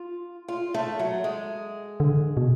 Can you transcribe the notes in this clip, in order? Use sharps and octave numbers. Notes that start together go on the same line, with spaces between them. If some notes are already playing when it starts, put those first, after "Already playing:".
Already playing: F4
F4
A3
F#3
G#3
D3
B2